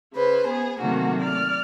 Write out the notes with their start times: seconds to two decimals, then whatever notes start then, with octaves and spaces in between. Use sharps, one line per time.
0.13 C#3 B4 C5
0.48 B3 G#4
0.80 C3 D#3 F#3 A3 A#3 F#4
1.22 D5 F6